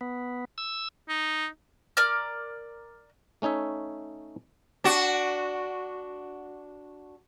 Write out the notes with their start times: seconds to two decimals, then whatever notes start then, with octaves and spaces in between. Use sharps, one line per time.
0.01 B3
0.58 E6
1.09 D#4
1.97 A#4 D5 F6
3.42 A3 C#4 D#4 C#5 E5
4.84 D4 F#4